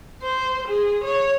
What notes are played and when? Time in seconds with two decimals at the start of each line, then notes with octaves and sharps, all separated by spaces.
0.22 C5
0.68 G#4
1.04 C#5